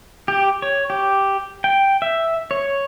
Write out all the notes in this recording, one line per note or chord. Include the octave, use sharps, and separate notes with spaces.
G4
C#5
G4
G5
E5
C#5